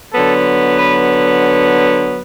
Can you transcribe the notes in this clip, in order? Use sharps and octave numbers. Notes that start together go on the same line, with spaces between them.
D3 F#3 B3 A4
B4